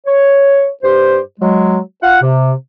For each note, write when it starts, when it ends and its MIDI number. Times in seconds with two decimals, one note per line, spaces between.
0.06 0.67 73
0.83 1.19 43
0.83 1.19 67
0.83 1.19 72
1.40 1.78 54
1.40 1.78 56
2.01 2.17 65
2.01 2.17 77
2.01 2.17 78
2.21 2.51 48